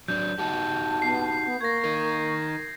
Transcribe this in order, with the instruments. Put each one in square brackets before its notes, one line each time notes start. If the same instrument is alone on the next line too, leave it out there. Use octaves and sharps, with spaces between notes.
[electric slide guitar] F#3 D4 [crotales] G6
[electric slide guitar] D#4 F#4 G4 [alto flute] A5
[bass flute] B3 [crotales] C7
[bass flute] B3
[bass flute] A#3 [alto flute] C#6 [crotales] G#6 A#6
[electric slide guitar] D#4 A#4